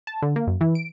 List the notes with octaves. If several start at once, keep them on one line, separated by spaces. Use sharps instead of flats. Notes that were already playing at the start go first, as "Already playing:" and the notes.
A5
D3
A#3
F#2
E3
D7